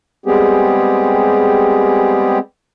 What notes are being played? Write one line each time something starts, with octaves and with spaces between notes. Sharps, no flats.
G3 G#3 B3 C4 G4 G#4